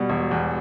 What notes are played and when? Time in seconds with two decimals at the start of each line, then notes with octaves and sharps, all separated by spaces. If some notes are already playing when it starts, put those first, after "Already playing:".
Already playing: B2 G3
0.10 E1
0.31 E2